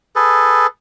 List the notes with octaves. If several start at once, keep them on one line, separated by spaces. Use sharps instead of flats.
G#4 A4 B4